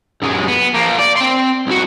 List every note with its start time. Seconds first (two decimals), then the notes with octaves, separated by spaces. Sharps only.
0.22 F#2 G#3
0.48 B3
0.74 F3 A#3
0.99 D5
1.17 C4 C6
1.67 C2 F#4